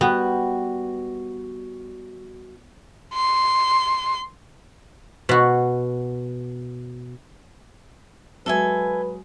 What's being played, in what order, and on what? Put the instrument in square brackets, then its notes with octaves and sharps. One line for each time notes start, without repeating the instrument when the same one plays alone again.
[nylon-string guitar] G3 F#4 G5 [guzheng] B3
[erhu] C6
[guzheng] B2 F#4
[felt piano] F#3 G#3 [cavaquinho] A4 E5 G#5 [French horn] B4